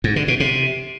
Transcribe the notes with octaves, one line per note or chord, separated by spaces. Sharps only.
G#2
D3
B2
C3